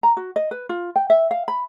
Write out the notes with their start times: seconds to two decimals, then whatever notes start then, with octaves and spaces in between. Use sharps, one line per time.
0.03 A#5
0.17 F#4
0.36 D#5
0.51 B4
0.69 F4
0.96 G5
1.10 E5
1.31 F5
1.48 B5